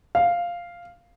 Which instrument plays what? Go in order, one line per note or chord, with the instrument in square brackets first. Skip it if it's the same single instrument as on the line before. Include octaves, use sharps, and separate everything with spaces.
[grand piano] F5